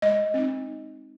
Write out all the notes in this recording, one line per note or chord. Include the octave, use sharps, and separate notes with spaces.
G#3 D#5
C4 D#4